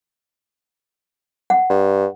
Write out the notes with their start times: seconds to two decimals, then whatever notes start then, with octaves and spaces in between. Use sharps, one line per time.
1.50 F#5
1.70 G2